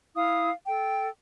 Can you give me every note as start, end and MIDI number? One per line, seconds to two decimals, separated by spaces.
0.15 0.51 64
0.15 0.51 77
0.15 0.51 87
0.67 1.07 69
0.67 1.07 79